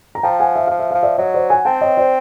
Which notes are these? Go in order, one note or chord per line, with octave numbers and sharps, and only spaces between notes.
A#5
F3 G5 A5
F#5 G#5
E5
F3 F5
E5
F3 F5
D5 E5
F#3 C#5 D#5
C5 D5
F#5 G#5
C4 G5 A5
C#5 D#5
C5 D5